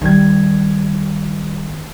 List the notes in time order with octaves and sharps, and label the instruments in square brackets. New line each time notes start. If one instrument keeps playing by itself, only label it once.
[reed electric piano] D#3 G#6 [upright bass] G3